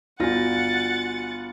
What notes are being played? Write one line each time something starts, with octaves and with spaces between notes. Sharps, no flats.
G1 F4 F#4 F#5 G#5 A6 A#6